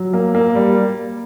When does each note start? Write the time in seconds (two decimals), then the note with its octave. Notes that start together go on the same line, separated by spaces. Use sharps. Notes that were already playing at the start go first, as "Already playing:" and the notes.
Already playing: F#3
0.14 A#3
0.35 A#3
0.55 G3